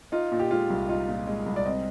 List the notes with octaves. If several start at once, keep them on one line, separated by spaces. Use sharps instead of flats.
D#4 F4
A#2
G4
G#3 F4
C2
D#4 F4
A#2
G#3
C2
D5
C4 D#5